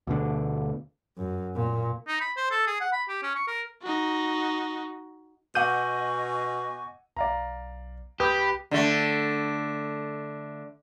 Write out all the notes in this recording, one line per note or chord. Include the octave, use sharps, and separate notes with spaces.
D2 B2 D3
F#2
A#2
D#4
B5
C5
A4
G#4
F#5
B5
G4
C#4
C#6
A#4
D#4 F#4
B2 D#5 F#5 G#5 C#6 D6 G6 D#7
B1 D5 F5 A#5
C2 G4 B4 D6 D#6 G6
D3 A3